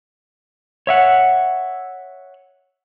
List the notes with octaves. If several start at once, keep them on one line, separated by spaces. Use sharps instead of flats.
C#5 E5 F#5